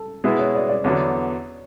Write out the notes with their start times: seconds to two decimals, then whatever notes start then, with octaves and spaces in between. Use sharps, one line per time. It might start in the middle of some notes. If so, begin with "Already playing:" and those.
Already playing: A4
0.24 B2 G#3 B3 E4 G#4 B4
0.39 C#5
0.55 D5
0.69 D5
0.84 E2 D3 F#3 B3 C#5